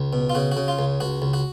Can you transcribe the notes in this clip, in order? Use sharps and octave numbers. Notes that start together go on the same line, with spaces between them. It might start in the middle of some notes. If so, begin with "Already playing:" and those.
Already playing: C#2
B2
F4
C#3 F#4
F#4
C#3
F4
C#2
C#2 F#4
C#2
F#4